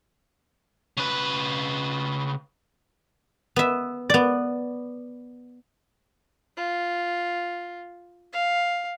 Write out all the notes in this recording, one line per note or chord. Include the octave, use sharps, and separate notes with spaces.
C#3 B4
B3 E5
B3 D5
F4
F5